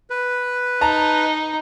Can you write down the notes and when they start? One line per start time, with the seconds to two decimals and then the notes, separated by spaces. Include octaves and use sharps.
0.10 B4
0.81 D#4 A5 A#5